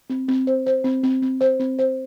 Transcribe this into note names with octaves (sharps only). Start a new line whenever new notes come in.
C4
C4
C5
C5
C4
C4
C4
C5
C4
C5